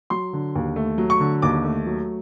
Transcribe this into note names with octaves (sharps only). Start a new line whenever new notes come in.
F#3 C6
D3
D#2
A3
F#3
C#6
D3
D#2 D6
A3
F#3